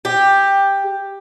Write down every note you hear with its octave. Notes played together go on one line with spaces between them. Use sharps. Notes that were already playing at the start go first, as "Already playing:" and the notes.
G4